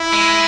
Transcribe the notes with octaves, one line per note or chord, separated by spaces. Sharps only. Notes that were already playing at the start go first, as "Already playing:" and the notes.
Already playing: E4
G#3